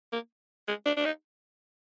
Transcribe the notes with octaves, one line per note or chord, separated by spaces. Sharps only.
A#3
G#3
D4
D4
D#4